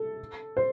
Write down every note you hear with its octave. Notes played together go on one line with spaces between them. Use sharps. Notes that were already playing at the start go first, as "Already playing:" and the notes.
Already playing: A4
C5